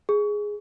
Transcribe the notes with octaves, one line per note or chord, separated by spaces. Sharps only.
G#4